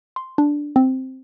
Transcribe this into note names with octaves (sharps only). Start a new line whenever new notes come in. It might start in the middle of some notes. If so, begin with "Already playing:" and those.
C6
D4
C4